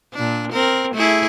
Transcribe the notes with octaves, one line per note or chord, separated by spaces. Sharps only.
A#2 D4
C4 A#4
A3 E4 G#4